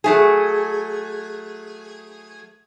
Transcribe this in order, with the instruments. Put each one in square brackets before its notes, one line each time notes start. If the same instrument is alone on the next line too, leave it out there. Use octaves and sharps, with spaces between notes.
[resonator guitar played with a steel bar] F#3 A3 G#4